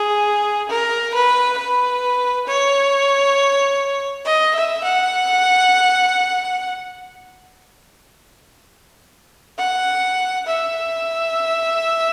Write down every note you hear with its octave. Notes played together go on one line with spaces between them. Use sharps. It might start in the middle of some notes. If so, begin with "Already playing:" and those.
Already playing: G#4
A#4
B4
B4
C#5
D#5
E5
F#5
F#5
E5